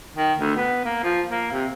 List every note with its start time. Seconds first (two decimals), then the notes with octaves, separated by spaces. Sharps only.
0.16 D#3
0.39 D2
0.56 B3
0.84 A#3
1.04 F3
1.30 A#3
1.52 C3